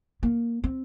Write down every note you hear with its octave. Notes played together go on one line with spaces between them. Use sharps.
A#3
C4